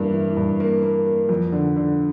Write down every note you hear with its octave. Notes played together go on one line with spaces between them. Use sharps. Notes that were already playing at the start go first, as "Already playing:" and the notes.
Already playing: G2 E3 A#3
E3
G2
A#3
A#3
A#3
F2
D3
D3